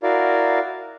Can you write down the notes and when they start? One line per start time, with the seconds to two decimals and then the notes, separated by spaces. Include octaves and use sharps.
0.03 E4 F#4 A#4 D5 F5